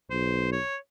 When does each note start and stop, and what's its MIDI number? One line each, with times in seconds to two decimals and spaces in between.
0.10 0.57 35
0.10 0.49 72
0.52 0.76 73